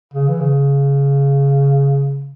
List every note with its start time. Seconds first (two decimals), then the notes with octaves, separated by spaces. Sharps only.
0.14 C#3
0.29 E3
0.41 C#3